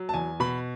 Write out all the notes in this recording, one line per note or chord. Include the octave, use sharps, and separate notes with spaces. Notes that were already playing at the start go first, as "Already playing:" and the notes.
Already playing: F#3
A5
E2 G#5
B2 B5